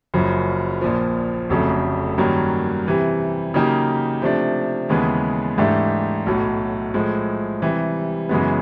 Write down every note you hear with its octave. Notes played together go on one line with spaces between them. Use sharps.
F#1 F#2 C#3 F3
A#1 A#2 F3
F1 F2 C#3 F#3 A3
G2 D#3 F#3 A#3 C#4
C3 E3 G3
C#3 F#3 A#3 D#4 G4
C3 F3 A3 D4
D#2 C#3 E3 G#3 B3
G#2 E3 A3 D4 G4
B1 A2 F#3
A2 F3 G#3
C3 E3 G3
F#2 C#3 E3 G#3 B3